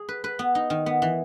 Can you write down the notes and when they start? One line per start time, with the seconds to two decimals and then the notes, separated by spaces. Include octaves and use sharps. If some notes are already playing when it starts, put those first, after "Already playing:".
Already playing: G#4
0.09 B4
0.24 B4
0.39 B3
0.55 D#4
0.70 D#3
0.86 B3
1.02 E3